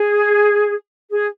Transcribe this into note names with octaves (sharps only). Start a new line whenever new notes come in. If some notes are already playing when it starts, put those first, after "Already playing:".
Already playing: G#4
G#4